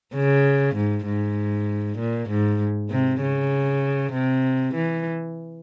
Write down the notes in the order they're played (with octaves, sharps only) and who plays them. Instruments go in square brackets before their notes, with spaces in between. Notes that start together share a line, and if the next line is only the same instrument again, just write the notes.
[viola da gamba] C#3
G#2
G#2
A#2
G#2
C3
C#3
C3
E3